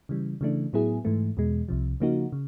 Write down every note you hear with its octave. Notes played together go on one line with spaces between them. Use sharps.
C#3 E3 G3
C#3 E3 A3 D4
A2 F#3 B3 E4 G#4
G#2 E3 A3
E2 B2 G#3
C2 C3 F3
C#3 F3 A#3 D#4 F#4
C#3